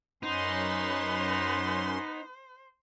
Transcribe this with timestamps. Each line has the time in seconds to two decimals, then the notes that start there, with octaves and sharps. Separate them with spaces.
0.23 F#2 B3 C#4 D#4 C5 C6